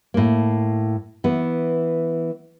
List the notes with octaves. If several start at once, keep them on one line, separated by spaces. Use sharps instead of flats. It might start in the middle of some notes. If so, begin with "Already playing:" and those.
A2 A#3
E3 B3